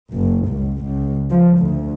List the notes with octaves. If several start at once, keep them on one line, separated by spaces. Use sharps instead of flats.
F#1
C#2
C#2
F3
D2